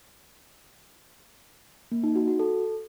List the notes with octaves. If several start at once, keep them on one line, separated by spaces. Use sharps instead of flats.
A#3
D#4
F#4
F#4
A4